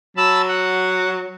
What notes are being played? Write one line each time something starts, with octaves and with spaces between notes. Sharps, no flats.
F#3 A5 B5 E6
F#5